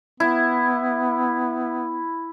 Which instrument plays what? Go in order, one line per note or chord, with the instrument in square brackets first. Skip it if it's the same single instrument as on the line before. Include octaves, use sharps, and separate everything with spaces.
[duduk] B3 [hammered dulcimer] E4